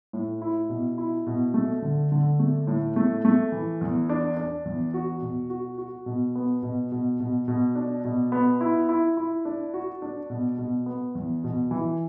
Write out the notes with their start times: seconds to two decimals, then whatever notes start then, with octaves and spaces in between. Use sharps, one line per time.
0.13 A2
0.42 E4
0.69 B2
0.98 E4
1.27 B2
1.54 A3
1.82 D3
2.12 D3
2.39 A3
2.67 A2
2.96 A3
3.25 A3
3.52 E3
3.81 E2
4.09 D4
4.37 D4
4.65 E2
4.94 F#4
5.21 B2
5.50 F#4
5.78 F#4
6.06 B2
6.35 B3
6.62 B2
6.92 B2
7.20 B2
7.48 B2
7.75 D4
8.04 B2
8.32 B3
8.61 E4
8.89 E4
9.17 E4
9.45 D4
9.74 F#4
10.02 D4
10.30 B2
10.58 B2
10.86 B3
11.15 E2
11.44 B2
11.71 E3